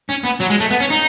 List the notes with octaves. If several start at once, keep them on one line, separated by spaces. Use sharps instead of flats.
C#4
B3
F#3
G#3
A3
B3
C#4
D#4